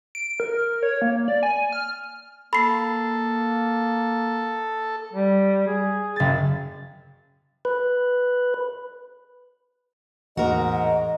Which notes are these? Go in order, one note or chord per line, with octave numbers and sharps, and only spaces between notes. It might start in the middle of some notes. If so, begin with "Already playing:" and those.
D7
A#4
C#5
A#3
D5
G#5
F6
A#3 A4 B5 C7
G3
G#4
F#1 A6
B4
A1 E2 G#2 A#3 F#4 A#4 D#5